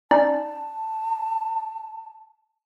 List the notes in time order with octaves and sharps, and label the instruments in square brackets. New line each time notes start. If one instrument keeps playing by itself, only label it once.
[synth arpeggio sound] C#4 D#4 D5 [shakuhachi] A5